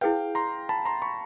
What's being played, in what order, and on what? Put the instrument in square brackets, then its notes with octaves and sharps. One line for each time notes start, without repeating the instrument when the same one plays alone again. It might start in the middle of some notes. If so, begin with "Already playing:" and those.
[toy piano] E4 G#4 B4 [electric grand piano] F5 G5
[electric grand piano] A#5 C6
A5 B5
A#5 C6
B5 C#6